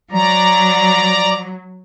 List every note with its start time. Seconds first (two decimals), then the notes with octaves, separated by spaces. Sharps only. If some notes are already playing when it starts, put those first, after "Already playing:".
0.12 F#3 D5 A#5